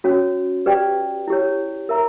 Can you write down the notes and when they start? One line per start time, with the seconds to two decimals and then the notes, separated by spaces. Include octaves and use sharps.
0.04 C#4 F#4 C#5
0.66 G4 B4 D5 G5
1.28 E4 G4 C#5
1.89 A#4 E5 A#5